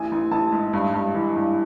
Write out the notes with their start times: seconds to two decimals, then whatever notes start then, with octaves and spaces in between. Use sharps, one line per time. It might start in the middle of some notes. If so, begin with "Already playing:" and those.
Already playing: A1 G#5
0.12 A1
0.31 A1 A5
0.52 G#2
0.73 G2
0.94 G2
1.14 E3
1.36 G2